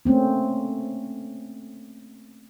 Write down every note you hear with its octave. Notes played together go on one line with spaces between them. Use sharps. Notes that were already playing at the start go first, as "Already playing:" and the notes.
A3 A#3 C4 C#4